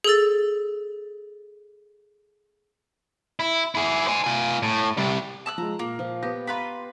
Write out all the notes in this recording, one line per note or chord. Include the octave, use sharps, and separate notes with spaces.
G#4 A4 E6 A6
E4
E4 G#4
C5 G#5
F4 G#5
A2
C3 G3
A5 E6 F#6
F3 G#3 A#5
A#2 A#3
F3
B3 G4 A#6
F4 B4 A#5 B5